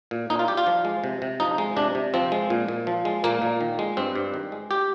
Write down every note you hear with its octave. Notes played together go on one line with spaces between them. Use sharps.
A#2
A#2 D#4
F4
G3 G4
F4
F3
G#3
C3
C3
F3 D#4
G#3
C3 D4
C3
F3 C4
G#3
A#2
A#2
F3
G#3
A#2 A#3
A#2
D#3
G#3
G2 C4
G2
D#3
G#3
G4